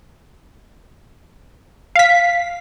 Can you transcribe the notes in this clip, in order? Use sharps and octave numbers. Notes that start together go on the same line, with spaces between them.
F5 B6